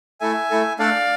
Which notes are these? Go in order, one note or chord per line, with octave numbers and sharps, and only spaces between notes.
A3 E4 A4 E5 G#5
A3 E4 A4
A3 D4 A4 D5 F5